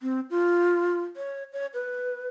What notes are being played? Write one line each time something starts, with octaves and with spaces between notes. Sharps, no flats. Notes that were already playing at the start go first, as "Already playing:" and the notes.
C4
F4
C#5
C#5
B4